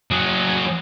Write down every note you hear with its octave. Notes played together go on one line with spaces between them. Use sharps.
F#3 G#4